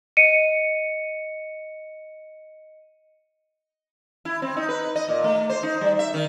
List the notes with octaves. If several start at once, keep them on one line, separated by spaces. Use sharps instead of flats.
D#5 C#7 D#7
E4
C4
D#4
B4
D#5
A#2
A3
C5
D#4
G3
E5
D#3